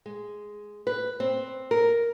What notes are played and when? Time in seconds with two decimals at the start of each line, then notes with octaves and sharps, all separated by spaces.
0.06 G#3
0.87 B4
1.20 C4
1.71 A#4